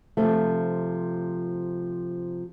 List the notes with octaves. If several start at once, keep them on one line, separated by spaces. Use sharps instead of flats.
C3 F3 A3